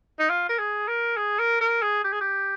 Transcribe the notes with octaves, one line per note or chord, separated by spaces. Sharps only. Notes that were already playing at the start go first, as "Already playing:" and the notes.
D#4
F4
A#4
G#4
A#4
G#4
A#4
A#4
G#4
G4
G#4
G4